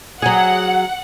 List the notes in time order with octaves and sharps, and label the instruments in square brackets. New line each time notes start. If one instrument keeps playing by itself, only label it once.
[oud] F#3 G#4 [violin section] F#5